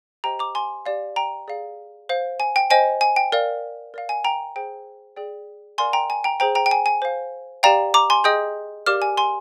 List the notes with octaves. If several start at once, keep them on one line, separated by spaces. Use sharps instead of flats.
G4 C5 D#5 G5 A#5
A#5 D6
G#5 C6
G4 D5 F5
G5 A#5
G#4 D5 F5
C5 F5
G#5
G5
C5 D#5 G5 G#5
G#5
G5
A#4 D5 F5
A#4 D5 F5
G#5
G5 A#5
G#4 C5 G5
G#4 D5 G5
A#4 D5 F5 G#5 C6
G5 A#5
G#5
G5 A#5
G#4 C5 G5 A#5
G5 A#5
G5
G#5
G#5
C5 F5
G4 D5 F5 G5 A#5
A#5 D6
G#5 C6
G#4 D#5 G5 D#6 G6
G4 A#4 D5 F5 D6 F6
G#5
G#5 C6